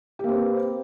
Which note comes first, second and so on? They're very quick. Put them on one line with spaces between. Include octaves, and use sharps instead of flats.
G4 A#3 C4 B4